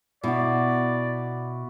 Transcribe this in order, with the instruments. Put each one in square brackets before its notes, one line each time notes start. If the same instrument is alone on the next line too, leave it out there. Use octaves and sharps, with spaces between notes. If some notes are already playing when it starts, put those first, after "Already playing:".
[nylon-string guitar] B2 [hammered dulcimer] E4 F#4 [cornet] D5